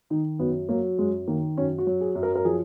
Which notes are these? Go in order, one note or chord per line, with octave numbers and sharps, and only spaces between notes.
D#3 D#4
F#2 B3
F#3 A#3
F#2 G#3
D#3 A#3
F#2 C#4
F#4
F#3
G#4
F#2
A#4
A#4
F3 G#4